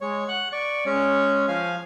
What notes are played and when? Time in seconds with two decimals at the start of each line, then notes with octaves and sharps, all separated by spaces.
0.01 G#3 C#5
0.29 F#5 F#6
0.52 D5 C#6
0.86 G#3 C#4 C#5
1.48 F3 F5 G#5